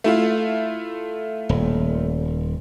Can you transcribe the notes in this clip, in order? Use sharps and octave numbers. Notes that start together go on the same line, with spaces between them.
A3 E4 F4
D#1